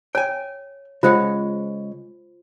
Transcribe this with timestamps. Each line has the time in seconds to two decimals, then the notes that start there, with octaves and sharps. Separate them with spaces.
0.15 C#5 G5 G#5
1.03 C#3 G#3 F4 C5 F#5